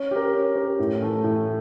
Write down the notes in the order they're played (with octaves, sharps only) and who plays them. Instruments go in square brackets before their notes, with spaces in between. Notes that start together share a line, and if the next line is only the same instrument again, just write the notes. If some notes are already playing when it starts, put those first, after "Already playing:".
Already playing: [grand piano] C#4
G4 A#4
C#4
G4 A#4
A2
E3 A3
A2